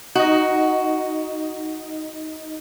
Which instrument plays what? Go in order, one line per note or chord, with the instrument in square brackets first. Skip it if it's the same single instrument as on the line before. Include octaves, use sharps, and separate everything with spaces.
[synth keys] D#4 D#5 [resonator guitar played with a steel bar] F#4